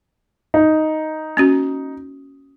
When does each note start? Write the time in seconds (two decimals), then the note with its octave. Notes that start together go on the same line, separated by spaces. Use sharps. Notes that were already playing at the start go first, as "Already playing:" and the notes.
0.54 D#4
1.37 A#3 C#4 F#4